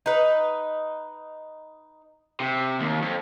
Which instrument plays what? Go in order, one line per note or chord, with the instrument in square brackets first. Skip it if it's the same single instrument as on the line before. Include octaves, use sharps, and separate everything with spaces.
[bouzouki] D#4 B4
[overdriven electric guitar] C3
D#2
F2